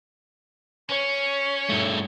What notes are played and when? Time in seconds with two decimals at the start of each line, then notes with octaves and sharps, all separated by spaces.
0.89 C#4 C#5
1.69 G2 A3